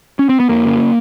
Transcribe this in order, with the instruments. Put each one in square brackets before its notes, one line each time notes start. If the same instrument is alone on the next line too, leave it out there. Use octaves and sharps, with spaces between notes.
[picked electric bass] C#4
C4
B3
F2 A#3
C#3